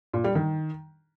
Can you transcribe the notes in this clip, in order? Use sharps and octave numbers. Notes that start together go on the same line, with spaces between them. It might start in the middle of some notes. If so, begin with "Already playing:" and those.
A#2
G3
D#3